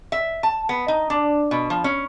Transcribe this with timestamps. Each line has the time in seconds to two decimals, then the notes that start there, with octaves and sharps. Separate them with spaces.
0.12 E5
0.43 A5
0.69 B3
0.88 D#4
1.10 D4
1.51 B2
1.70 F3
1.84 C#4